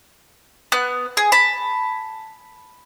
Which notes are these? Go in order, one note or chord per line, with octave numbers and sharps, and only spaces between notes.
B3 F#6
G#4
A5 B5